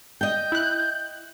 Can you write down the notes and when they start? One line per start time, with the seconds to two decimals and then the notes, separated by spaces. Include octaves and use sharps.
0.21 D#5 G5 G6
0.52 E4 F#6